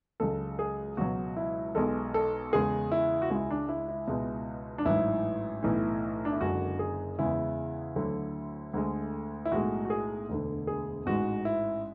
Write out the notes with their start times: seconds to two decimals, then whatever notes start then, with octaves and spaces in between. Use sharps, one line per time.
0.20 C#2 C#3 F#3 A4
0.59 G#4
0.97 C#2 B2 F#3 F#4
1.37 E4
1.75 B1 B2 G#3 A4
2.14 A4
2.52 E2 C#3 G#3 G#4
2.92 E4
3.22 F#4
3.30 C#2 C#3 G#3 E4
3.50 D4
3.69 E4
3.88 E4
4.08 C#2 B2 G#3
4.78 D4
4.85 A1 G#2 F#3 E4
5.63 B1 A2 E3
6.25 D4
6.32 E4
6.41 F#1 F#2 D3 G#3 F#4
6.79 G#4
7.19 E2 C#3 G#3 E4
7.96 D2 D3 F#3
8.74 D2 D3 G#3
9.45 E4
9.51 B1 A2 G#3 F#4
9.85 F#4
9.90 G#4
10.29 E1 D2 D3
10.67 G#4
11.06 A1 G#2 G#3 F#4
11.45 E4